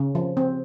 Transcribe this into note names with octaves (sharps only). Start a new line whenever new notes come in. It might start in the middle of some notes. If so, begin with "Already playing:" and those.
Already playing: C#3
F3
C4